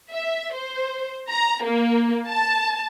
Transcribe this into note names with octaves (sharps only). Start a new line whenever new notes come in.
E5
C5
A#5
A#3
A5